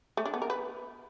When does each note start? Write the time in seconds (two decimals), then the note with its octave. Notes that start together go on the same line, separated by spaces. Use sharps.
0.17 A3
0.25 D4
0.34 B3
0.42 A#4
0.50 B4